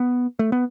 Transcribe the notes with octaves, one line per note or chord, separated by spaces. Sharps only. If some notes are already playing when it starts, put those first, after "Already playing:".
Already playing: B3
A3
B3